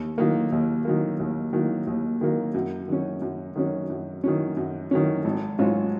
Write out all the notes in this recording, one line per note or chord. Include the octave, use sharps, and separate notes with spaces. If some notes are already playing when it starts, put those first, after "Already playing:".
Already playing: D#2
D#3 F#3 A#3
D#2
D#3 F#3 A#3
D#2
D#3 F#3 A#3
D#2
D#3 F#3 A#3
F#2
D#3 F#3 C#4
F#2
D#3 F#3 C#4
F#2
D#3 F#3 C#4
F#2
D#3 F#3 C#4
G#1
G#2 F#3 C#4 F4